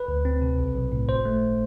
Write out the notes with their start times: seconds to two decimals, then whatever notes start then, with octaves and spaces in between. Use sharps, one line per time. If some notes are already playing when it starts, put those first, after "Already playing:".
Already playing: B4
0.08 D2
0.25 C4
0.42 C3
0.58 B1
0.75 B1
0.92 A2
1.09 G1 C5
1.25 A3